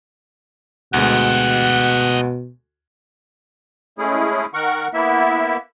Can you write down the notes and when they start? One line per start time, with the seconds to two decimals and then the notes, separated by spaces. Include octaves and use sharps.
0.94 D2 B2 G#3 G4 D#5 F#5
3.98 G#3 A3 C#4 E4 G#4
4.54 D#3 A#4 F#5 C#6
4.94 A#3 B3 E4 E5